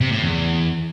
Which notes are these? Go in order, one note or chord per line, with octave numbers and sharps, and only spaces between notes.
C3
A2
E2